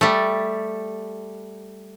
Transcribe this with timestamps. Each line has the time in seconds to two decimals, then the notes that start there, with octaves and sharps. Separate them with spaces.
0.01 G3 A3